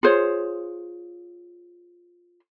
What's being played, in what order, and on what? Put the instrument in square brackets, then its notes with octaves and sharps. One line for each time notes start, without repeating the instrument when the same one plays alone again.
[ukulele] F4 G#4 C5 C#5